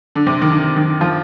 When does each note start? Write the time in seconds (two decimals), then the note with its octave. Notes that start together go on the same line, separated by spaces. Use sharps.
0.15 D3
0.26 C3
0.42 D#3
0.51 D3
0.76 D#3
1.01 F3